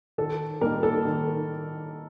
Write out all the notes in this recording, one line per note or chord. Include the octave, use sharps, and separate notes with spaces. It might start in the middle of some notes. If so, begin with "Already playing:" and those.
D#3 A4
G3 A#3 D#4 A#4
A4
D#3